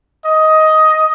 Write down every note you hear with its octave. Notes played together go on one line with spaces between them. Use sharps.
D#5